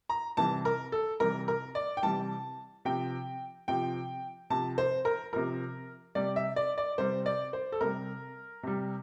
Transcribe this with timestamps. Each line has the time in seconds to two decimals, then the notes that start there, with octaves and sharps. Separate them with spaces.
0.09 A#5
0.37 C3 E3 G3 A5
0.65 A#4
0.92 A4
1.20 C3 E3 G3 A#4
1.48 A#4
1.75 D5
1.97 G5
2.03 C3 E3 G3 A5
2.85 C3 F3 G5
3.68 C3 F3 G5
4.50 C3 F3 A5
4.78 C5
5.05 A#4
5.33 C3 F3 A#4
6.15 C3 G3 D5
6.36 E5
6.56 D5
6.78 D5
6.98 C3 G3 C5
7.26 D5
7.53 C5
7.72 A4
7.81 C3 G3 A#4
8.63 C3 G3